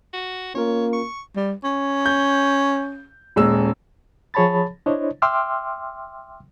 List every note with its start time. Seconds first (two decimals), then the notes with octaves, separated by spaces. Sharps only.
0.13 F#4
0.55 A#3 C#4 F4 A#4 C#5
0.93 C#6
1.36 G3
1.64 C#4
2.06 G6
3.36 D#1 G#3 E6
4.34 F3 G#4 C#5 A5 B5 A6
4.86 D4 E4 C5 C#5 D#5
5.22 E5 G5 C6 D6 E6 F6